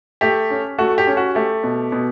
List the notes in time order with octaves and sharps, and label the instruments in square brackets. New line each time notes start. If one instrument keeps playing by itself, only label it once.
[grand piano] A3 G4
C#4
A3 F#4
G4
C#4
F#4
A3 G4
B2
B2